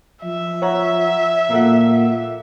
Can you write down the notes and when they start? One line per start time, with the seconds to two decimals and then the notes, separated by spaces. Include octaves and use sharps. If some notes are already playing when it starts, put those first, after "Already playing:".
0.24 F3 E5
0.62 C#5 F#5 A#5
1.50 A#2 A#3 A4 F#5